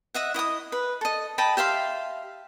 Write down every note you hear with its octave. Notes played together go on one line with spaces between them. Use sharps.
D#5 E5 F#5
E4 D#5 F#5 D#6
B4
A4 D#5
D#5 G5 A5 B5
G4 E5 F5 C6